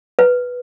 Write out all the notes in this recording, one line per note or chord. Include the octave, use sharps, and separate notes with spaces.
B4